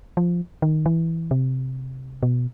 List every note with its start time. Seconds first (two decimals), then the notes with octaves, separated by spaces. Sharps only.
0.17 F3
0.62 D#3
0.86 E3
1.31 C3
2.23 B2